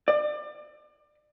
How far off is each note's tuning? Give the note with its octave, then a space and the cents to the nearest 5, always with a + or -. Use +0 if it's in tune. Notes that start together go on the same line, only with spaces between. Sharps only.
D5 +30